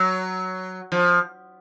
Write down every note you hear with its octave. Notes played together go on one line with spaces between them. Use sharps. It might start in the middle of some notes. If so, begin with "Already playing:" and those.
Already playing: F#3
F3